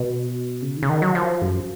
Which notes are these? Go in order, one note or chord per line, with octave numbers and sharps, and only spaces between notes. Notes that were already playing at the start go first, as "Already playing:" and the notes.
Already playing: B2
C#3
D#3
C#3
D#3
F#3
F3
F#2